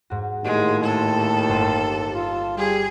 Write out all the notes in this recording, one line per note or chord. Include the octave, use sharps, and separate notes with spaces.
G#2 F#4
D#2 A2 G#3
A4
G1 C5 D#7
F4
G3 G#4